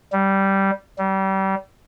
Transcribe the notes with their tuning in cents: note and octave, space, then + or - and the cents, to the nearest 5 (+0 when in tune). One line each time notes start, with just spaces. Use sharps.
G3 -10
G3 -30